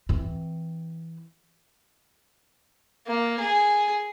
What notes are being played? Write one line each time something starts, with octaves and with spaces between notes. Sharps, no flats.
E3 C4
A#3
G#4